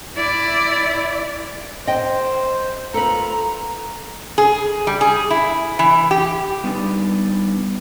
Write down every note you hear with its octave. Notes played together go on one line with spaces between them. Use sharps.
E4 D5
C5 D#5 G5
F4 A4 B4 A#5
G#4
G3
G#4
E4
E3
G4
G3 B3 D4 D#4 G4